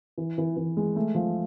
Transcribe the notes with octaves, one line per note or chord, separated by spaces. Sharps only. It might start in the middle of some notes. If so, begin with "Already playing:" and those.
E3
E3
E3
G#3
A3
F3